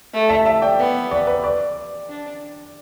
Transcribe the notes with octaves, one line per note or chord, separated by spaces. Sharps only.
A3
E5 A5
E5 A5
D5 G5
B3
D5
B4
D5
D4